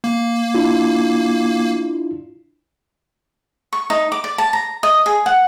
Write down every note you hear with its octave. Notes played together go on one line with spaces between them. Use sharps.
A#3
D4 E4 F4
C#6
D#4
D6
D5
A5
A#5
D#5
G#4
F#5